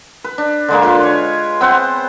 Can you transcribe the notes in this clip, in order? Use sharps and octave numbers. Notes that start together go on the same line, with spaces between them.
B4
D4
D3 G#3 A#3
F4 B4
C#5
B3 C4 C5 F#5